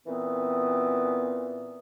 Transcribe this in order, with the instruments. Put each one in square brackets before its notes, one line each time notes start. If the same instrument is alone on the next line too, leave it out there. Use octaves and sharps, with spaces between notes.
[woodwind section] A#2 E3 B3 C4